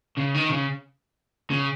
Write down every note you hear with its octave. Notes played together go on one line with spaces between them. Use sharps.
C#3
D#3
C#3
C#3